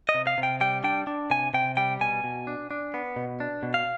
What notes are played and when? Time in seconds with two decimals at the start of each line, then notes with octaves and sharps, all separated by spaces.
0.09 D#5
0.14 C3
0.27 F5
0.38 C3
0.43 G5
0.61 G3 G5
0.84 D4 G5
1.07 D4
1.30 C3 G#5
1.54 C3 G5
1.77 G3 G5
2.01 B2 G#5
2.24 B2
2.47 D4
2.71 D4
2.94 B3
3.16 B2
3.40 D4
3.63 B2
3.74 F5